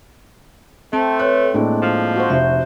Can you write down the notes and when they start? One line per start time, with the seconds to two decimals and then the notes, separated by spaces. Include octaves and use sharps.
0.93 A3 C4 A5
1.19 A4 B4 C#5 F#6
1.54 A2 G#3 A#3 C4 D4 D#5
1.82 F3
2.16 F#4 C5
2.30 F1 E5